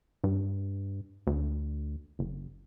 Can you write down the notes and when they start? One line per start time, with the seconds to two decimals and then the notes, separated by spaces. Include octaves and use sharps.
0.24 G2
1.27 D2
2.19 F#1